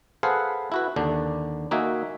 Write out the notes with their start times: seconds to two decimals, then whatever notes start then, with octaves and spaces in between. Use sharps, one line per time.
0.23 G#4 A4 B4 C5 F5 F#5
0.72 E4 F#4 B4
0.96 D#2 D3 D4
1.71 A#3 D#4 F#4 E5 G#5